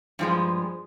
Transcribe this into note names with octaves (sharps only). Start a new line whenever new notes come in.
G2 F3 G#3